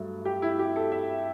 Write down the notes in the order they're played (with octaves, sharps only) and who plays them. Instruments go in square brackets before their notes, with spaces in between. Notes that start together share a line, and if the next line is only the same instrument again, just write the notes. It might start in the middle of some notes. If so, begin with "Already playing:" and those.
Already playing: [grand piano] G2 F#3 A3
G4
E4
G4
A4
E5